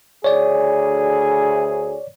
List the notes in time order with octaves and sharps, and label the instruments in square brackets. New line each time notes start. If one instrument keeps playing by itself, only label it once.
[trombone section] D2 G#4 [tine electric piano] C#5 D5